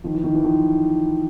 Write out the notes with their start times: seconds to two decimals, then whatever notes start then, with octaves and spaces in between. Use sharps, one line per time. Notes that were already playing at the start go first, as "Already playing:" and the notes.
0.04 D#3 F3
0.14 E3
0.24 D#3
0.34 E3
0.43 D#3 F3